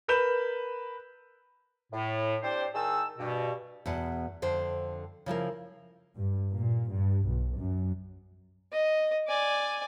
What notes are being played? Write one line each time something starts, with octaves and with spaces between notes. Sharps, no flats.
A#4 B4 B5 G6 E7
A2
C4 D4 G4 C5
D#3 G#4 A5 E6
G2 B2
E2 B2 F#5
F2 D3 C5 G5
C#3 F3 E4 A#4
G2
A#2
G2
B1
F#2
D#5
D5 G#5